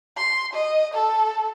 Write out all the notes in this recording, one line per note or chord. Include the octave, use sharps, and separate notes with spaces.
C6
D#5
A4